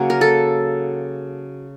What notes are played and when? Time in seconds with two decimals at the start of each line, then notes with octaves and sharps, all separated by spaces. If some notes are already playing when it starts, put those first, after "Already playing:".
Already playing: C#3 F#3 A#3 F#4
0.10 A#4
0.21 A4